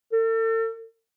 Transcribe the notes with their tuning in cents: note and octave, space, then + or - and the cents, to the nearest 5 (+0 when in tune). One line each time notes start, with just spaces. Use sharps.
A4 +40